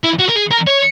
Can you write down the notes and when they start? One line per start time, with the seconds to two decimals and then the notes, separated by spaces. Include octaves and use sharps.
0.04 E4
0.20 F#4
0.29 A#4
0.36 G#4
0.51 A#4
0.67 C#5